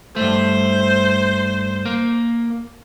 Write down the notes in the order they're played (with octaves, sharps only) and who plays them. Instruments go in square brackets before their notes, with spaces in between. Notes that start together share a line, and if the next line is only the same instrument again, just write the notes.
[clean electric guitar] G2 A3 [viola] C5
[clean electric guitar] A#3